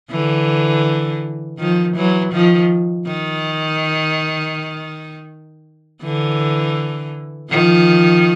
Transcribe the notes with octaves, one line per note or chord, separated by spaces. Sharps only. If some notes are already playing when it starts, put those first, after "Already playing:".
D3 E3
D#3 F3
E3 F#3
D#3 F3
D#3
D3 E3
D#3 F3